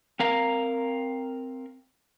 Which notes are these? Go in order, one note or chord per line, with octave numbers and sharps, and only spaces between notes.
C4 A#4 F5 A#5